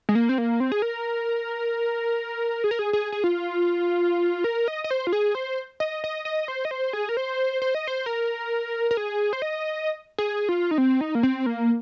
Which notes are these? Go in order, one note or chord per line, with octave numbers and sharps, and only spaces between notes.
G#3
A#3
C4
A#3
C4
G#4
A#4
G#4
A#4
G#4
G#4
G#4
F4
A#4
D#5
D#5
C5
F4
G#4
C5
D#5
D#5
D#5
C5
D#5
C5
G#4
A#4
C5
C5
D#5
C5
A#4
A#4
G#4
C5
D#5
G#4
F4
D#4
C4
D#4
A#3
C4
A#3